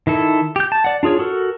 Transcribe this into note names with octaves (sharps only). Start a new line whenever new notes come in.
D#3 E4 A4
G4 G6
A5
D5 F#5
D4 F4 G#4 C#5
F#4 A4 A#4